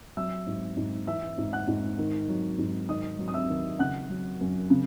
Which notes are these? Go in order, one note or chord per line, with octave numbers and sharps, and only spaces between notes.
F#3 E5 E6
G#2
G#2
E3 E5 E6
G#2
F#5 F#6
G#2
D#3
F#3
G#2
D#3 D#5 D#6
F#3
D#6
E5 E6
D#2
C#3 F#5 F#6
F#3
F#2
C#3